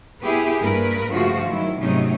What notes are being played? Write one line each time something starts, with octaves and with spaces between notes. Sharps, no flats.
B3 E4 G4 G#4 B4
G2 A#3 A#4 B4
G2 C#3 F3 A3 F4 F#4
D#3 F#3 E4
G#2 C3 F#3 A3 C#4 D#4